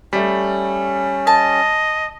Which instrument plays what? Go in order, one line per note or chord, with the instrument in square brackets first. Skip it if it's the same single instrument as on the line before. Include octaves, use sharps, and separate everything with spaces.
[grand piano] G3 A3 [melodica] C#4
[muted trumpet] D#5 [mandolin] A5